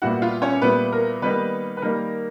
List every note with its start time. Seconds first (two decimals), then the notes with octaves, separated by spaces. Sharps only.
0.02 A#2 G3 B3 E4 F#4 F#5
0.22 F4 F5
0.42 C#4 C#5
0.62 A#2 G3 B3 E4 B4
0.92 A#4
1.22 D#3 G3 A#3 B3 D#4 B4
1.77 B4
1.82 D#3 G3 A#3 D#4 A#4